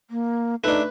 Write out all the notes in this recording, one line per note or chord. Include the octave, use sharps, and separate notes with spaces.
A#3
A3 D4 D#4 B4